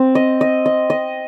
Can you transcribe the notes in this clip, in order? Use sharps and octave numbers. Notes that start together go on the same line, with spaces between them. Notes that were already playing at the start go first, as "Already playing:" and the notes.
Already playing: C4
D#5
D#5
D#5
D#5